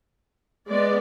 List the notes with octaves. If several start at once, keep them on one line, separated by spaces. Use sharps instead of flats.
G#3 B3 D5